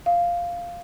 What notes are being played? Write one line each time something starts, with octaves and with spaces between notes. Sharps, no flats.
F5